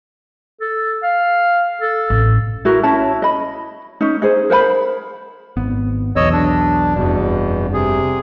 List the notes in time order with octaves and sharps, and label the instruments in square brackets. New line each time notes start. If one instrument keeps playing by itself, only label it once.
[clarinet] A4
F5
A4
[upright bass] A1
[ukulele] E4 F#4 A#4
C#4 E4 C#5 A5
D#5 B5
C#4 D#4
D#4 G#4 C5
A#4 C5 F#5 B5
[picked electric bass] G#1 B3
[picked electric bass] B1 E2 [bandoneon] C#5 D#5 E6
[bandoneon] D4
[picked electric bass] F1 G2 [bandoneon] E2 B2
[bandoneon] C3 G#4